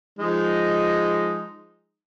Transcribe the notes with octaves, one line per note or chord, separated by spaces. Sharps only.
F3 G#3 D#4